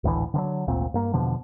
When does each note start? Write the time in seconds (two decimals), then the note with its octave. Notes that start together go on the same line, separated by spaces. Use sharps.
0.04 G#1 D2 A2 E3
0.34 D3 E3 F#3
0.67 G#1 D2 A#2 C4
0.94 G2 A#3
1.13 E2 B2 D3 F3